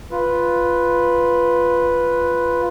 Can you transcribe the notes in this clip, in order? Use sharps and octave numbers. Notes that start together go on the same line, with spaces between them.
F4 B4